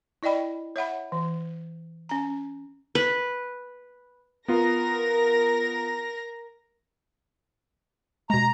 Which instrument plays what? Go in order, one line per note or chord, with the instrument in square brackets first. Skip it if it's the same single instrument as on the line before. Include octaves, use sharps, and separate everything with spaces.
[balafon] E4 D5 D#5 G5 B5
C#5 E5 F#5 B5
E3
C#4 A#5
[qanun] B4
[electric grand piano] B3 F4 [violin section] A#4 A#6
[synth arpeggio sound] B2 G#3 [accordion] A#5